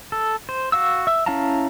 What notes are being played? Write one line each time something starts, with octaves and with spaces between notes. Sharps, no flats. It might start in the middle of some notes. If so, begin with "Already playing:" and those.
A4
C5
F#4 F5 E6
E5
C#4 E4 F5 A5 A#5